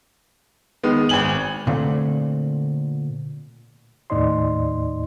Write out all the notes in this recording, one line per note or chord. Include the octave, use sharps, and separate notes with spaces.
D#3 G#3 B3
G#1 G#5 F#7
A#2 D3 A3 C4
D#2 A2 D#4 D5 D#5 C6